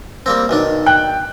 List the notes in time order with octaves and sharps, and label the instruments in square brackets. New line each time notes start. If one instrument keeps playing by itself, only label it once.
[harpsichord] G3 A#3 C4
B1 D#3 D4
[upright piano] G5 F#6